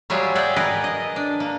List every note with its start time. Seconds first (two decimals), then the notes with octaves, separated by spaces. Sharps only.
0.10 F#3 G3 F4 G#4 E5 F#5
0.35 G#4 D5 E5 F#5 G5
0.56 G#4 A#4 B4 D5 D#5
0.84 D#5
1.16 D4
1.40 A#3